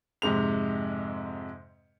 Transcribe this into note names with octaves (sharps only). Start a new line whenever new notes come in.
F2 G#2 C3 G#3 F7